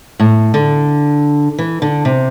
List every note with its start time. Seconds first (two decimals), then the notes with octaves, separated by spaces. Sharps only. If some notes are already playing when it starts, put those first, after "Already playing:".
0.20 A2
0.54 D3
1.58 E3
1.82 D3
2.05 C3